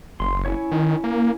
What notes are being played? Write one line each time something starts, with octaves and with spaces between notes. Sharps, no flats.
F#1 C6
C#4 E4 C#5
D#3
A#3